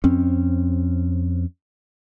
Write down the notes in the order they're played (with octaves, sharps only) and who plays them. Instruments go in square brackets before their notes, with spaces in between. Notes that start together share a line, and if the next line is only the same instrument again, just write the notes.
[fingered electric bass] F2 C4 C#4